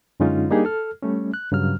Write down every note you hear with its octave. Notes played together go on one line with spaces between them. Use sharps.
F#2 D3 G#3 C#4 D#4 F4
G3 A#3 D4 D#4 G4 G#4
A4 F6
G3 A3 C#4
F#6
G2 C#3 F#3 F6